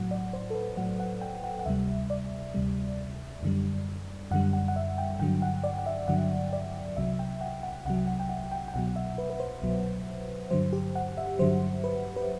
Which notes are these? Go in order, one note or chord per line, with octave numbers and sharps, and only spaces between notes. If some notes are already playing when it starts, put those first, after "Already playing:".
Already playing: A2 F#3 F#5
D5
C5
A4
B4
A2 F#3 F#5
F#5
G5
F#5
F#5
D2 C3 G3 E5
D5
D2 C3 G3
F#2 D3 G3
F#2 D3 G3 F#5
F#5
F#5
E5
G5
G2 D3 F#3 G5
F#5
D5
F#5
E5
G2 D3 F#3 F#5
D5
C2 C3 F#3 E5
G5
F#5
F#5
C2 C3 F#3 F#5
F#5
G5
F#5
G5
G5
C2 B2 F#3 F#5
E5
B4
B4
C5
C2 B2 F#3
G2 D3 F#3 C5
G4
F#5
E5
G2 D3 F#3 C5
B4
B4